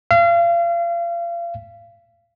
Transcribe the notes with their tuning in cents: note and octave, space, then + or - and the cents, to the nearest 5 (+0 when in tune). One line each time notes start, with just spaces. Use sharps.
F5 -35